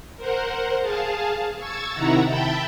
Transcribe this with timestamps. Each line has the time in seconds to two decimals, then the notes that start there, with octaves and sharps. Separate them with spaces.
0.17 A#4 C5 F#5
0.81 G#4 F5 A5
1.57 C#6 E6 G#6 A6
1.93 C3 D#3 E4 F#5 A#5
2.26 E5 G5 A5 B5 G6 A6